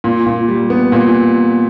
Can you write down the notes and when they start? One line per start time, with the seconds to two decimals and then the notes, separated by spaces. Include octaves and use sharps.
0.04 A#2
0.26 A#2
0.48 G3
0.70 B3
0.92 A#2